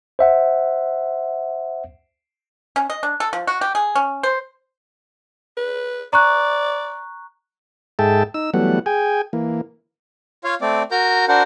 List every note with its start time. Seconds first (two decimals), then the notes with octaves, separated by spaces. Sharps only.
0.19 C5 E5 F#5
2.76 C#4
2.90 D#5
3.03 D4
3.20 A4
3.33 F3
3.47 F#4
3.61 G4
3.75 G#4
3.95 C#4
4.23 C5
5.57 B4
6.13 D5 A#5 C#6 F#6
7.99 G#2 G#4 A4 E5 G5 A5
8.34 D#4 E6
8.54 E3 F#3 G3 A3 B3 F#5
8.86 G#4 G5 G#5
9.33 E3 A#3
10.44 F4 C#5 F5
10.61 A3 C4 D5
10.91 F#4 A#4 A#5 G6
11.28 D4 F#4 A#4 C5 F#5